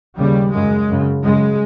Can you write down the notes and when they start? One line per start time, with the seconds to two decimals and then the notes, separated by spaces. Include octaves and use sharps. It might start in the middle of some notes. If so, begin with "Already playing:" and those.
0.18 D#2 C#3 G3
0.53 F#2 C#3 G#3
0.88 F#2 C#3
1.24 F#2 C#3 G#3